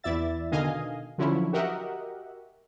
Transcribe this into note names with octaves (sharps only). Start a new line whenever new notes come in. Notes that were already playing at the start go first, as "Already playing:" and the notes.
E2 E4 D5 E5 A6
B2 D3 D#3 D#5 F5 G#5
D3 F3 F#3 C#4 E4
F#4 G4 A#4 D#5 E5 F#5